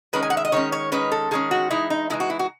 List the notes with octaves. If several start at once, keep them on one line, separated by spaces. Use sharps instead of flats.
D#3 G#3 C#4 B4
G#5
F#5
E5
D#5
D#3 G#3 C#4 C#5
C#5
D#3 G#3 C#4 B4
A4
D#3 G#3 C#4 G#4
F#4
E3 G#3 D#4 E4
D#4
E3 G#3 D#4 E4
F#4
E4
F#4